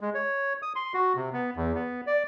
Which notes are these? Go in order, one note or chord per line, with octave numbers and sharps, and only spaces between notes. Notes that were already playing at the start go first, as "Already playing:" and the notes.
G#3
C#5
D#6
C6
F#4
C3
B3
E2
B3
D5